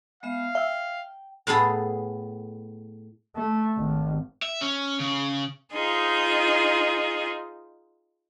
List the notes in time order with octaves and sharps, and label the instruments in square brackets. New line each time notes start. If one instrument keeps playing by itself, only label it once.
[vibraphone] G#3 B3 E5 [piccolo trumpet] F5
[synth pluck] E5 E6 [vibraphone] G5
[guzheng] A2 B3 G#4 A4
[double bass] A3
G#1
[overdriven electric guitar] E5
C#4
C#3
[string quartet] D#4 F4 G#4 C5